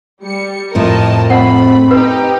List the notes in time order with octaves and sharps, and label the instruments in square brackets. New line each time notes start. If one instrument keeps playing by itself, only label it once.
[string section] G3 C#7
[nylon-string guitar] F2 A2 F3 [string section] A#4 D#5 A5
[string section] A3 B5 [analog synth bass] C4 [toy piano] F#5
[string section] D#4 G4 [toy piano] B4